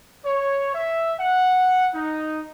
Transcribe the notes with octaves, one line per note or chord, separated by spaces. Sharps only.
C#5
E5
F#5
D#4